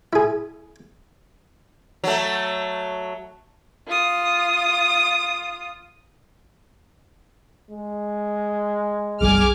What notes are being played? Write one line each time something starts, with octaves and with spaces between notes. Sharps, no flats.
E4 G#4
F#3 A3
F4 D#6
G#3
F#1 B1 G3 G#4 G#5 D6 F6